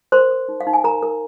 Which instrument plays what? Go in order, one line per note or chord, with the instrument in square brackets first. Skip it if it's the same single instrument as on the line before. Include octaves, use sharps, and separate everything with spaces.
[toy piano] A#4 C5 C6
A#4
D#4
F5
D#4
G#5
A#4 A#5
A#4